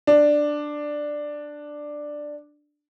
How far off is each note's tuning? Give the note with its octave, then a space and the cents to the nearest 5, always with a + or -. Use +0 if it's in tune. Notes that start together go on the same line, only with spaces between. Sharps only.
D4 +5